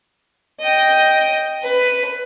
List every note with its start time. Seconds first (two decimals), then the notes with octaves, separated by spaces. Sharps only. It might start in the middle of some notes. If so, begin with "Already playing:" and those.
0.60 D#5 G5
1.63 B4